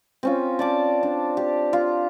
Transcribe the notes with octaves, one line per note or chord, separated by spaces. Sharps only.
C4 C#4 F4
D5 A5 D6
D4
G4
F4